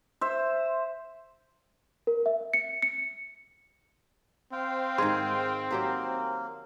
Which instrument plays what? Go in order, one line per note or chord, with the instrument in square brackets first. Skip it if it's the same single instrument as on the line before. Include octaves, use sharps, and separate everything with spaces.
[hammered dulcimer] C5 E5
[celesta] A#4
E5
C#7
C#7
[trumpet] C4 [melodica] C5 F5 G5
[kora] G#2 D#3 G#4 [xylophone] C6
[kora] F#3 G4 C5 [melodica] A#3